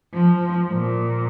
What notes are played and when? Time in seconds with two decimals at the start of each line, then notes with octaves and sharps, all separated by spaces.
0.14 F3
0.72 A#2